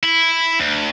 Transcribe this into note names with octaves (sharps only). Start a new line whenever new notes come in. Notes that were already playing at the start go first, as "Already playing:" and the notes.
E4
D2